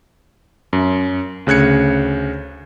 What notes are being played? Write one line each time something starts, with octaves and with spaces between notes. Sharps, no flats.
F#2
D2 C#3 F#6 G#6 C#7